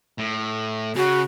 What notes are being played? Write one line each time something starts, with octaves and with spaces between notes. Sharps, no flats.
A2
C#3 F#4